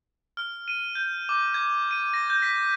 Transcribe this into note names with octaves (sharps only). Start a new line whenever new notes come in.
F6
D#7
G6
D6
G#6
D#7
A#6
G6
B6